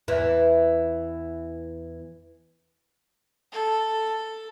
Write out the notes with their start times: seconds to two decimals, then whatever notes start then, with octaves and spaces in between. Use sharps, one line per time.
0.08 E2 E3
3.52 A4